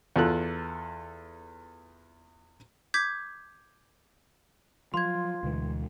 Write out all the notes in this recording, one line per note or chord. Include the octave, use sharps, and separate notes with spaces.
E2 F4 A4 F#6
D6 G6 G#6 B6
F3 F#3 F4 C6 G#6
D2 B2 E3 G#3